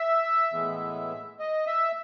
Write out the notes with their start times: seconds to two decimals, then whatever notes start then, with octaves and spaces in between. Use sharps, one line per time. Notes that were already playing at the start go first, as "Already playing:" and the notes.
Already playing: E5
0.53 A2 E3 G#3 B3
1.39 D#5
1.66 E5